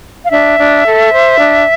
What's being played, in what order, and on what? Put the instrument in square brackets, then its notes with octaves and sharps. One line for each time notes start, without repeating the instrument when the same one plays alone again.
[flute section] F5
D4 E5
D4
A4
C5
D4